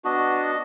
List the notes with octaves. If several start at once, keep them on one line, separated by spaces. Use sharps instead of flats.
B3 D4 F#4 D#5